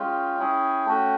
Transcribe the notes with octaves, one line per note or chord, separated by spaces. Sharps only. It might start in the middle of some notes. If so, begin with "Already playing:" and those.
Already playing: G#3 C#4 F4 G5
C#4 E4 G#4
A3 C#4 F#4